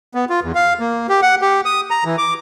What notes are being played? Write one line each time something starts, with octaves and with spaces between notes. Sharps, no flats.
B3
F4
E2
F5
A#3
G4
F#5
G4
D#6
A#5
E3
D6